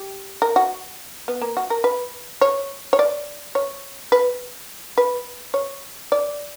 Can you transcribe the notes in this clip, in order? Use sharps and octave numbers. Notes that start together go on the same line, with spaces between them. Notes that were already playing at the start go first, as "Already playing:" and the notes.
Already playing: G4
A#4
F#4
B3
A#3
F#4
A#4
B4
C#5
C#5
D5
C#5
B4
B4
C#5
D5